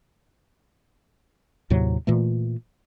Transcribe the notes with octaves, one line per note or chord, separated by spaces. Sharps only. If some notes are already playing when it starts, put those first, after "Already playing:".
D#2 A2 C3 F#3
A#2 E3 A3